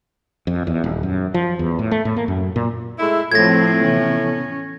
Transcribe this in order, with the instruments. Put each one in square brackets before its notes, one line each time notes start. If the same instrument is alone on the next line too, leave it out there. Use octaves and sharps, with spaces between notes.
[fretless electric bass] F2
E2
D#1
F#2
F3
E2
A2
A3
A2
A#3
F#2
A#2
[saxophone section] G#3 A3 E4
[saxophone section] A2 [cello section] F3 A3 C4 [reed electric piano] F4 [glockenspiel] G#6 A#6
[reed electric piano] C3 E3 B3 [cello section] C#4